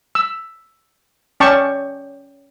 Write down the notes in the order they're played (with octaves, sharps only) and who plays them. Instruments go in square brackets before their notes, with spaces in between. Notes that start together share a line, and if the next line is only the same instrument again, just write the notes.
[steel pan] E6
C#4 D5 G5 A5 C#6